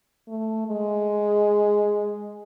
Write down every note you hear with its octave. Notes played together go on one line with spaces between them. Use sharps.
A3
G#3